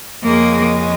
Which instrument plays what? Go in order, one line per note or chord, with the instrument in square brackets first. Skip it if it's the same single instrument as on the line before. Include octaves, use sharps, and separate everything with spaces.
[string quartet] F2 C#3 G#3 [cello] A#3